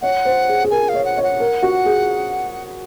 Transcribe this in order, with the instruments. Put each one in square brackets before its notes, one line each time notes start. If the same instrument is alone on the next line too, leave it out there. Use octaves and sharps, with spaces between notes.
[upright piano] C#5 [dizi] F#5
[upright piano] C5
G#4
G#4
[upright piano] A#4 [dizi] G#5
[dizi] F5
[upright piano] C#5
[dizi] F#5
[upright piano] C#5
[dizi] F#5
[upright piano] A#4
F#4
G#4